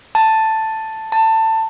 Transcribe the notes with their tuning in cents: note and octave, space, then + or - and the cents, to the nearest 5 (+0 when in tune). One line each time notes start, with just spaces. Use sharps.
A5 +5
A5 +20